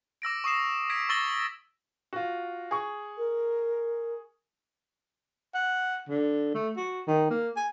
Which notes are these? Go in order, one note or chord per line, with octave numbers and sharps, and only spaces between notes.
D6 E6 A#6 D7
C#6 D#6 C7 E7
G#6 B6 D7
C#6 E6 A6 A#6 F#7 G7
F4 F#4
G#4 C#6
A#4
F#5
D3
A3
F#4
D#3
A#3
G#5